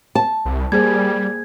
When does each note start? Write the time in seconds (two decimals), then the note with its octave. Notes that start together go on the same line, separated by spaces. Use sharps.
0.15 A5
0.45 C2
0.72 G3 A#3 G#4 C5 G#6